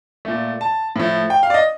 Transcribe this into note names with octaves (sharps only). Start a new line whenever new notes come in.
A#2 A3
A5
A2 F3 A3
G5
F5
D5
D#5